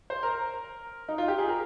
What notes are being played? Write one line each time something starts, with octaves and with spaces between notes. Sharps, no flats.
C5
A#4
D#4
F4
G4
G#4
A#4